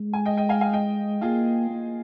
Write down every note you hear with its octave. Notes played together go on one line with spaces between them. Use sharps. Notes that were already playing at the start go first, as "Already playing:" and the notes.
Already playing: G#3
G#5
D#5 G5
D#5 G5
F5 G#5
F5 G#5
D#5 G5
A#3 F4 G#4
A#3